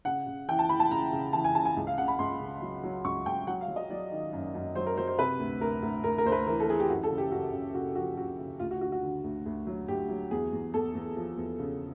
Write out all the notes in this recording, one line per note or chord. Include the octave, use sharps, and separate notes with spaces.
C#3 F#5
C#3
E3 G5
A5
E3 B5
A5
C#3 A#5
C#3
E3 A5
G#5
C#3 A5
G#5
C#2
F5
C#3 F#5
B5
C#2 C6
C#3
F#3
F#3
C#2 C#6
C#2 G5
F#3 F#5
F5
F#3
D#5
F#3 D5
D#3
F#2
F#2
F#3 C5
A#4
F#3 C5
C5
C3 B4
D2
D2 A#4
D2
D2 A#4
A#4
D2 C5
B4
E3 A#4
A4
E3 G#4
G4
F#2 F#4
A4
C#3
G4
F#2 F#4
C#3
C#3 F#4
F3 F#4
C#3 F#4
C#3
D2 F4
F#4
D3 F#4
F#4
D3
D2
D2
F#3
D2 G4
F#3
E2 G#4
E2
E2 A4
E2
F3
E2
C#3